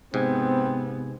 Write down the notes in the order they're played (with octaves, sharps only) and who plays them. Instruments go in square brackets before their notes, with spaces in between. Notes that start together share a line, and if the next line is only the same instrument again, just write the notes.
[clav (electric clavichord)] G#2 [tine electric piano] C3 G#5 G#6 [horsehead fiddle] B3 [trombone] C4